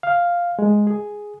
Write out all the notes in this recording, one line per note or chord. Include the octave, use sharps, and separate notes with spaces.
F5
G#3
G#4